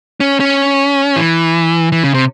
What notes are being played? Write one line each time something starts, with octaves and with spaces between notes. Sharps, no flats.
C#4
C#4
E3
E3
C#3
C3